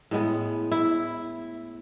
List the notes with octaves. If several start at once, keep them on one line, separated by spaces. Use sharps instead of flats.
A2 G#3 B3
E4